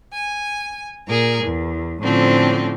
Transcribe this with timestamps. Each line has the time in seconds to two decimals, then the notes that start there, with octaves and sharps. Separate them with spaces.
0.13 G#5
1.08 A#2 G#4 A#4
1.43 E2
2.01 A2 D3 F3 C4 C#4